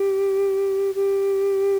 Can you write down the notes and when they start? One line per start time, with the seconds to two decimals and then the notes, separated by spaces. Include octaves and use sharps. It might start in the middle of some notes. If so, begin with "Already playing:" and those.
Already playing: G4
0.95 G4